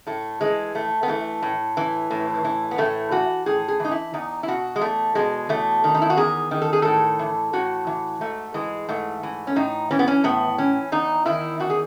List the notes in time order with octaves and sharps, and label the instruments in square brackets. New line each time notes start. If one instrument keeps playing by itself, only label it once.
[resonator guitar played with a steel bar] A2 A3
E3 G#3
A2 A3
B3
E3 A3
A2
E3
A2
E3
B3
A2 A3
E3 F#4
A2 G#4
G#4
E3 D#4
E4
E2 D#4
E4
B2 F#4
G#3
E2 A3
B2 G#3
E2 A3
D#3
D#4
E4
F#4
E2 G#4
D#3
A4
G#4
A2 A4
E3
A2 F#4
E3
G#2 A3
E3 G#3
G#2 A3
E3
C#4
A2 D#4
E3 C#4
B3
C#4
A2 B3
E3 C#4
E2 D#4
D#3 E4
E2 F#4
G#4